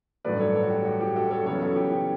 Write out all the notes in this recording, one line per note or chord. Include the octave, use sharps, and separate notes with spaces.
A1 G2 F#3 A3 D4 B4 D5
A4 C#5
A4 C#5
F#4
G4
F#4
G4
F#4 A4
A4 C#5
F#2 C#3 E3 B3 A4 C#5
F#4 A4
G4
G4